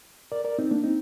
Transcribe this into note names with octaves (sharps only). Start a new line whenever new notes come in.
A#4 D5
A#4 D5
C4 D#4
A#3 D4
C4 D#4